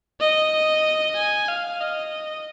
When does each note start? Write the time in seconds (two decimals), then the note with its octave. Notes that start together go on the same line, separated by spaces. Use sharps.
0.20 D#5
1.16 G#5
1.48 F5
1.81 D#5